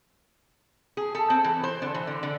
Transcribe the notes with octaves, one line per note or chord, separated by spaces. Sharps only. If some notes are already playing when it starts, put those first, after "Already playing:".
G#4
A4
C4
E3
C5
D3
E3
D3
D3